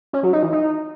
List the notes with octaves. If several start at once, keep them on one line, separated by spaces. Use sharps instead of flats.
C#4
F#3
D#4
E3
D#4